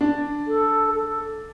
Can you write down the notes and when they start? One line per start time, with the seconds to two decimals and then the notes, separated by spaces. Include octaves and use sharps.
0.01 D4
0.48 A4
0.94 A4